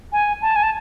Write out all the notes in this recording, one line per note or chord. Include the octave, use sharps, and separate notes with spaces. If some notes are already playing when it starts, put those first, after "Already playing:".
G#5
A5
G#5
A5